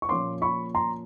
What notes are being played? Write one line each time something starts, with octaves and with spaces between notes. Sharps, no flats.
C#6
A#2 F3 A#3 C#4 C6 D6
B5 C#6
A#5 C6